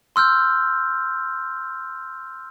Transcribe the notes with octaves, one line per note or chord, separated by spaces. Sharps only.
C6 E6 F6 G6